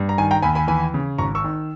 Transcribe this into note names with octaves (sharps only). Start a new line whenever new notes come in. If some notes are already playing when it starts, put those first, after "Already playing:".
Already playing: G2
A#5
D#3 G#5
G5 A#5
D#2 G#5 B5
G#5 B5
E3 G#5 B5
C#3
G#1 A#5 C#6
C#6 E6
D#3